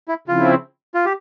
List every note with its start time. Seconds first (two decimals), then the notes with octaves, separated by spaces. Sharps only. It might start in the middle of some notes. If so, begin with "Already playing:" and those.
0.08 E4
0.28 C#3 F3 C4 E4 F4
0.94 F4
1.05 G4